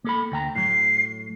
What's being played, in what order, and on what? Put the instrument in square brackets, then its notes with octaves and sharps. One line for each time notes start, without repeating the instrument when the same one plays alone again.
[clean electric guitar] A#3 A4 B5
D2 G5 A#5
[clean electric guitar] A2 F#3 [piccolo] C7